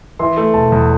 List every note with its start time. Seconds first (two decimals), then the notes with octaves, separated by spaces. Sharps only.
0.19 E3 C6
0.37 A3
0.54 E1 A5
0.72 E2